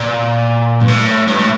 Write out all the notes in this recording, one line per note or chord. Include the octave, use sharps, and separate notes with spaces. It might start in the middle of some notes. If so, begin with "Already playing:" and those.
Already playing: A#2
G2
A2
G2
A2